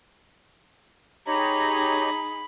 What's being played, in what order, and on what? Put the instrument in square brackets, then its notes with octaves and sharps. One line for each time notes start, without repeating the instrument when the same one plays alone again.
[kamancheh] D#4 G#4 [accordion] G4 C#5 D#5 [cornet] A#5 [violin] B5